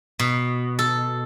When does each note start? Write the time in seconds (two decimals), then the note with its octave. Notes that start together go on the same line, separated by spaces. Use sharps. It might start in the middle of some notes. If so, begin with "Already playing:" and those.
0.19 B2
0.79 A4